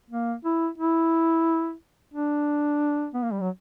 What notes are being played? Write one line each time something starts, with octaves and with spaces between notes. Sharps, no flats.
A#3
E4
E4
D4
B3
A#3
G3
F#3